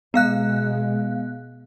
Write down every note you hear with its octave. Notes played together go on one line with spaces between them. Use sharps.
B2 G#3 B3 F5 F#6